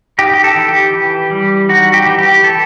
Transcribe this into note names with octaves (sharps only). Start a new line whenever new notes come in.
D#4 G4
G4
A4
E3
G4
E3
G3
D#4 F#4
G4
E3
G4
E3 A4